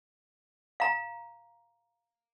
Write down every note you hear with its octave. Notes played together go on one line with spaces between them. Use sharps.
F5 A#5